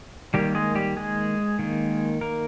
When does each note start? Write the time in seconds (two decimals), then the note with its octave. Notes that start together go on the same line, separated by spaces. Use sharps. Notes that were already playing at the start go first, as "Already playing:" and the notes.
0.34 D#3 G3 A#3 G4
0.55 G#3 G#4
0.75 G3 G4
0.96 G#3 G#4
1.59 D#3 A#3
2.21 A#3 A#4